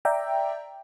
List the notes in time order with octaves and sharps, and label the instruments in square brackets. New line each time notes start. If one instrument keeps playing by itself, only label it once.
[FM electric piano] D5 E5 G5 A#5